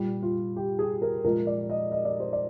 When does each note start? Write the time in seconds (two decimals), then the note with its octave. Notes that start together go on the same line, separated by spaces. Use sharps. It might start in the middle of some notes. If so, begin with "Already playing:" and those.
Already playing: A#2 G3
0.23 F4
0.56 G4
0.79 G#4
1.02 A#4
1.24 A#2 F3 G#3 A#4
1.47 D5
1.70 D#5
1.92 D#5
2.05 D5
2.20 C5
2.33 D5